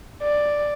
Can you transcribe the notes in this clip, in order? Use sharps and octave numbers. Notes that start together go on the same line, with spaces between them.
D5